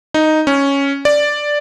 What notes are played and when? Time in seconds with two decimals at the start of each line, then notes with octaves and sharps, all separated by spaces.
0.14 D#4
0.47 C#4
1.05 D5